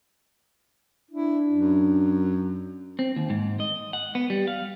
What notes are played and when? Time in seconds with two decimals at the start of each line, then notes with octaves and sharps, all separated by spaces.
1.11 D4 E4
1.51 F#2
2.99 C4
3.16 D#2
3.30 G#2
3.60 D#5
3.93 F#5
4.15 B3
4.30 G3
4.48 F5